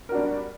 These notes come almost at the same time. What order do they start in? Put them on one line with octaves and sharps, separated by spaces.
A#4 F#4 D4 G3